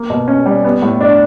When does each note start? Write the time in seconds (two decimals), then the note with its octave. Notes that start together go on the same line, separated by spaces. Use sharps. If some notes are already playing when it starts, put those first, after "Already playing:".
Already playing: A#3
0.10 B2
0.28 C#4
0.46 G3
0.64 B3
0.82 A2
1.01 D4